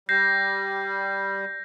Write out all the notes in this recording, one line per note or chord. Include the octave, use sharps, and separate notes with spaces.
G3 G6 A#6 C7